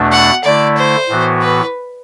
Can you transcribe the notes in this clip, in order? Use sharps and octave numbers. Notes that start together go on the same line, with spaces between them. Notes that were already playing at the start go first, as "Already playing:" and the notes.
Already playing: E2 B2 A3 D4
F#5
D3 A3 E4 D5
C5
A2 E3 B3 F#4
B4